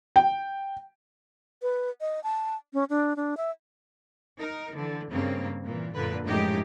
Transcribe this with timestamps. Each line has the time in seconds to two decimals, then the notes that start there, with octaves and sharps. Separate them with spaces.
0.16 G5
1.62 B4
2.01 D#5
2.24 A5
2.74 C#4
2.90 D4
3.16 D4
3.37 E5
4.38 D#4 A#4
4.72 D3 E3
5.11 G2 C#3 A#3 C4
5.64 A#2 E3
5.95 F#2 A#2 D3 B4
6.25 F#2 A2 F3 G#3 D#4 G4